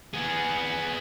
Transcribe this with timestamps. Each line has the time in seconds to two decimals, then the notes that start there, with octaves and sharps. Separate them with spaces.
0.14 B3 G#4